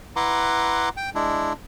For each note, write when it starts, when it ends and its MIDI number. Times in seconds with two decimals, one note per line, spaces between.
0.16 0.89 64
0.16 0.89 71
0.16 0.89 78
0.16 0.89 82
0.16 0.89 84
0.16 0.89 86
0.97 1.10 79
1.15 1.53 56
1.15 1.53 62
1.15 1.53 64